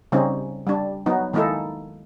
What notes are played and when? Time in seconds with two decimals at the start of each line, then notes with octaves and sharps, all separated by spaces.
0.12 C#3 G3 C4 C#4 D#4
0.67 G3 D4
1.06 F#3 B3 D#4
1.33 D#3 G#3 A#3 D#4 E4 A4